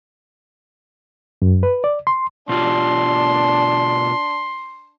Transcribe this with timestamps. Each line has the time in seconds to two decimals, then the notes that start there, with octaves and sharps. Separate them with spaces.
1.42 F#2
1.63 B4
1.84 D5
2.07 C6
2.49 B2 D4 F4 G4 C6